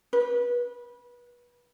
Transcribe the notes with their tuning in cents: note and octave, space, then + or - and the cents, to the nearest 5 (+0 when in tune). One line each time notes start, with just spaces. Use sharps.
B4 -25